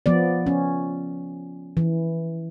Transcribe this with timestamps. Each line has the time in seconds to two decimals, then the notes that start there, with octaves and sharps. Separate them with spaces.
0.06 F3 B3 D5
0.46 C#4
1.77 E3